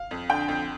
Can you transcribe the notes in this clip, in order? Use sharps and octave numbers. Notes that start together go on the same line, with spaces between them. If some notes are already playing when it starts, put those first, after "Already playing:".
Already playing: F5
F2
D3 G5
F2